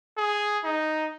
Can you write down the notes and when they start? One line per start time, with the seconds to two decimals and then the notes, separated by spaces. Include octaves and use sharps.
0.17 G#4
0.64 D#4